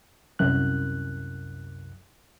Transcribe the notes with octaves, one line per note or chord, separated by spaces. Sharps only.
C2 F#2 F#6